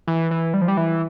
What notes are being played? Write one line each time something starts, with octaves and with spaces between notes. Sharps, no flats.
E3
E3
G3
F3
G3
E3